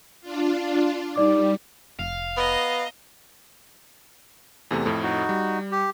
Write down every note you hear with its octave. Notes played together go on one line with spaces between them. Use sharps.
D4 F4
G3 D#4 D5 D6
F1 F5
B3 D#5 A#5
E2 C3 A3
F2 A2
D#4 F#4
G3
G4